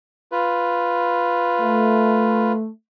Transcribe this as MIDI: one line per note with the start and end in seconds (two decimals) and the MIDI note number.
0.32 2.52 65
0.32 2.52 71
1.61 2.67 57